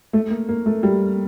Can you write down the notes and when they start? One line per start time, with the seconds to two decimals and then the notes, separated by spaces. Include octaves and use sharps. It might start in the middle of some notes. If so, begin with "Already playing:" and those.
0.13 A3
0.30 A#3
0.49 A#3
0.66 A3
0.83 G3